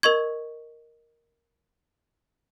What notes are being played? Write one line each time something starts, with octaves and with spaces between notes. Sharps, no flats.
A#4 D#5 C#6 G#6